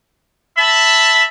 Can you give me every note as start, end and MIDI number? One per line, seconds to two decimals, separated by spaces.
0.56 1.24 76
0.56 1.24 81
0.56 1.24 83